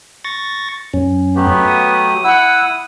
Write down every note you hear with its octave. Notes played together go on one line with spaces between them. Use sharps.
C#6 A6 A#6
F#2 C#4
F#3 A3 B3 G4
D#6
E4 F#5 E6